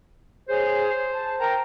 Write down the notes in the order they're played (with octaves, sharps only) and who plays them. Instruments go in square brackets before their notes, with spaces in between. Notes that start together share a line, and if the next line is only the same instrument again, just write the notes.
[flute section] G#4 C#5 [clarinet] C5
[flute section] A5
A#4 G5 A#5